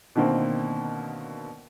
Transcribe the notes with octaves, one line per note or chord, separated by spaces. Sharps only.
B2 D3 D#3 A#3 C4